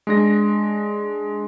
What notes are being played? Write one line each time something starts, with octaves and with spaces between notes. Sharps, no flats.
G#3 D4 A#6